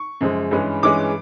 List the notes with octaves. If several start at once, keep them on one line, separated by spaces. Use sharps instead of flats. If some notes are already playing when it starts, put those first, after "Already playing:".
Already playing: C#6
F#2 C#3 F3 G#3
G2 E3 G#3 C#4
G2 E3 G#3 C#4 D6